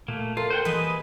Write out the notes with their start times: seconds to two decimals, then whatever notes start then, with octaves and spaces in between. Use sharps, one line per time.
0.08 A#2 A3 A#3
0.37 G2 F4 A4 A#4
0.50 C5 F#5 G5
0.65 E3 G3 A#3 G#4 B4 D#5